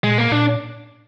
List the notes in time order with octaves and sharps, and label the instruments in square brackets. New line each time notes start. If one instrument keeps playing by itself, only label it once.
[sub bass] A#2 [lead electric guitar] G#3
[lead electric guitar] A#3
[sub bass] A#2 [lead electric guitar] D4